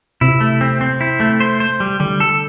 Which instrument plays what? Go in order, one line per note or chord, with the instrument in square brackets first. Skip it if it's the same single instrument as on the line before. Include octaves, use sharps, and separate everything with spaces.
[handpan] C3 [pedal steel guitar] E4
[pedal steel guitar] A3
C4
C4
E4
A3
C5
C5
G3
[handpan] D3 [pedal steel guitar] G3
[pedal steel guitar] A4